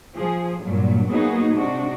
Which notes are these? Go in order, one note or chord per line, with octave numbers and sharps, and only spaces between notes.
F3 G#4
G2 A#2 F#3
F#3 A#3 B3 D#4 F#4 G#4
C3 G#3 D4 D#4 F#4